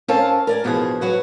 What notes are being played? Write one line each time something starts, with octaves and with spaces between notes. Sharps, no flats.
C4 C#4 A4 A#4 F5 A5
A#4 D5 G#5
E2 B2 F3 D4 G#4
F#3 F#4 B4